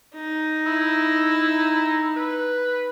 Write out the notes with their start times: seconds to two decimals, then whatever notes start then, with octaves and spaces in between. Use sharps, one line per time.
0.15 D#4
0.67 E4
2.16 B4